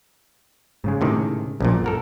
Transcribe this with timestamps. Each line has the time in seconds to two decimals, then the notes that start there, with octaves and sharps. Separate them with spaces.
0.84 G#2 C#3 G#3
1.01 A2 C3 D#3
1.60 A#1 F#2 A#2
1.84 A4 A#4 F#5